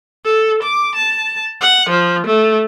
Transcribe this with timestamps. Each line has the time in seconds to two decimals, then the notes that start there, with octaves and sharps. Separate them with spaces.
0.25 A4
0.63 D6
0.95 A5
1.61 F#5
1.90 F3
2.27 A3